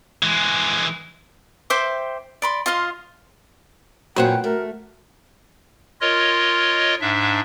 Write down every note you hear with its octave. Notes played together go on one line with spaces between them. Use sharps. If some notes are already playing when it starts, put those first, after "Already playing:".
E3 G#3
C5 E5 G5 D6
D5 B5 C6
F4 D#5 F5 C6
F#2 A#2 C#4 F#4 B4 C5 F#5 G5
A3 A#4
F4 A#4 C#5 D#5
G#2 D4 E5